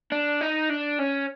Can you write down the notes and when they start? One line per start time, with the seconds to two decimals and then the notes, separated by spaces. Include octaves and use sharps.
0.12 D4
0.41 D#4
0.70 D4
0.99 C#4